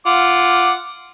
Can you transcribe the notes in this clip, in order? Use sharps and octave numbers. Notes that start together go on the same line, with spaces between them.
F4 F#5 D6